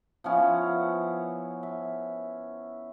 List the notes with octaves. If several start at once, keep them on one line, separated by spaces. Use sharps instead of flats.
F3 B3 C#4 E4
E5